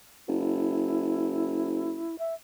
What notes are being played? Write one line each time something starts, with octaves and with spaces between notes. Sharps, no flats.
F#1 E4
E5